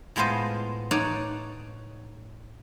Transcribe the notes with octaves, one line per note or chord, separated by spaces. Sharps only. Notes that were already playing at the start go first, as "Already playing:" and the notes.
A2 G#3 B3 F4 C5 D#5
D#4 C#5 D5 F#5 A5